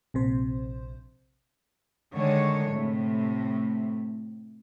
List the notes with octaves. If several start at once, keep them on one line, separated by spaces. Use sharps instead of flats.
A#1 C3 C5
D3 D#3 G#3 C#5
A2 C3